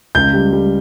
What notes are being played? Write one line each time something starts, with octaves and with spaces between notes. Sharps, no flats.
C#2 G6
G3
G3